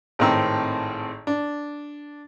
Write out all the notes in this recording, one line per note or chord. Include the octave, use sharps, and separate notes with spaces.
G#1 A2 D#3 C4 A#5 E6
D4